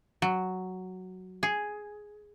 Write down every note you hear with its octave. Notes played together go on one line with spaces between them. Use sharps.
F#3
G#4